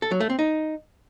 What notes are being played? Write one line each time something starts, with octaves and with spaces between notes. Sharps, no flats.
A4
F#3
A3
C4
D#4